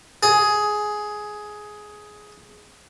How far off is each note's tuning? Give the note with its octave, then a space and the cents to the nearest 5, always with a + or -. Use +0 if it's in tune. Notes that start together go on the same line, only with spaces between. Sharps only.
G#4 +10